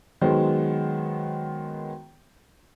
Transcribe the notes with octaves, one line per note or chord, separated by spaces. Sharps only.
D#3 F#3 G#3 B3 F#4 C5